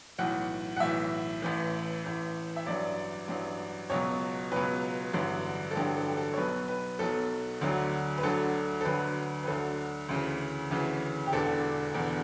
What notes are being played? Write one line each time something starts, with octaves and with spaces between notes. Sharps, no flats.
B1 A2 E3 F#5
F#5
B1 A2 E3 E5
A1 A2 E3
A1 A2 E3
E5
A1 G2 F#3 D5
A1 G2 F#3
C#2 B2 F#3 C#5
C#2 B2 F#3 B4
A1 G2 D3 F#3
A4
A1 G2 D3 F#3 G4
A4
G4
A4
C#5
B1 B2 F#3 B4
B4
B1 B2 F#3 A4
D2 D3 F#3
B4
D2 D3 F#3 A4
A4
D2 D3 F#3 B4
B4
D2 D3 F#3 A4
D2 C#3 E3
D2 C#3 E3
G4
E1 E2 D3 A4
E1 E2 D3